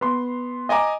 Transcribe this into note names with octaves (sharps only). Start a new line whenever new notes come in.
B3 C6
D#5 G#5 A#5 D6